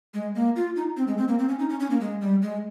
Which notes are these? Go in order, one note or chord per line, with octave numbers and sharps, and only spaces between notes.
G#3
A#3
F4
D#4
C4
G#3
C4
A#3
C4
C#4
D#4
C#4
C#4
A#3
G#3
G3
G#3